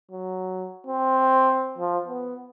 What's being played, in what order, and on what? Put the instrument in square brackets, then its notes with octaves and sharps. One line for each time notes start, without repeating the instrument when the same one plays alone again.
[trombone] F#3
C4
F3
B3